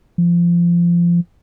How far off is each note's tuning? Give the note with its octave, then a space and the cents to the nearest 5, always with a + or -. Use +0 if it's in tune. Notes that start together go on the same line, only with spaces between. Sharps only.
F3 -20